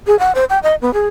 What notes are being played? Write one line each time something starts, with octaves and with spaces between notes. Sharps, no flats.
G#4
F#5
C5
G5
D#5
B3
G#4